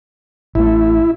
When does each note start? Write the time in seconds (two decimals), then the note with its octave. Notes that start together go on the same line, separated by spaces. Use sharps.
0.55 A1 A3 E4